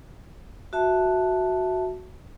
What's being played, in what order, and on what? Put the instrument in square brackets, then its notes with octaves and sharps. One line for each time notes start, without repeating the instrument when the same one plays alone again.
[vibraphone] F#4 E5 A5